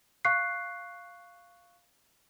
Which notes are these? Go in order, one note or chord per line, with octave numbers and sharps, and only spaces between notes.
F5 C#6 F#6 C7